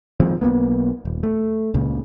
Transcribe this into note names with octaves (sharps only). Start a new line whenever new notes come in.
D#3 F3 G#3 C4
B1 F#2 A#3 B3
D#1
A3
C#2 A#2 C#3